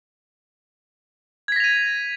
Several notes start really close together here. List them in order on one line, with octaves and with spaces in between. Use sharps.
G#6 B6 A#6 F7 D#7